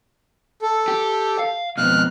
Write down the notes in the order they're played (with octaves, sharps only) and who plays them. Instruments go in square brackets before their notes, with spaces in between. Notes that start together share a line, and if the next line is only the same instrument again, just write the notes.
[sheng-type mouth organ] A4
[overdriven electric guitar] G4
F5
[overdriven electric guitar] F2 B2 [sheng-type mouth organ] F6 F#6